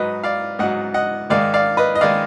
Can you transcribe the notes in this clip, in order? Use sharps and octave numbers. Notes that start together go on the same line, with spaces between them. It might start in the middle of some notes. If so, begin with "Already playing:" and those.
Already playing: G#2 F#3 B4 D#5
D5 F5
G#2 F#3 D#5 F#5
D#5 F#5
G#2 D#3 G#3 D5 F5
D5 F5
B4 D#5
D#5
D#3 G#3 D5 F5